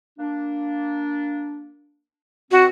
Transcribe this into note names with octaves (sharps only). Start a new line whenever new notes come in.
A#3 D4
B2 C4 F#4